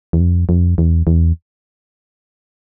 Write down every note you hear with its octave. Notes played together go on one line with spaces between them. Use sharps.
E2
F2
F2
E2
E2